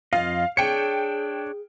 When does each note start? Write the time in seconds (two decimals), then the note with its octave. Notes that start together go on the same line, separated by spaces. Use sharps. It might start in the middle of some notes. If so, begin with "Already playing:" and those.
0.13 F2 F4 D#5 F5
0.57 D4 G#4 C#5 G5 C#7